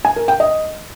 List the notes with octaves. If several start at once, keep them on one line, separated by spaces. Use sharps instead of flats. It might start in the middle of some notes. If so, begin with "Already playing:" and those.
G#5
A#4
G5
D#5